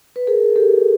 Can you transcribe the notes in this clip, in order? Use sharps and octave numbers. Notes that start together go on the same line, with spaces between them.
B4
G#4 A#4
G4 A4